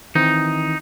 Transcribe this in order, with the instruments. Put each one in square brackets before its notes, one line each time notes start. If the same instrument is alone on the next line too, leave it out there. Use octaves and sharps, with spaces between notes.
[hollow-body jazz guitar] D#3 E3 C4 [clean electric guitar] D#4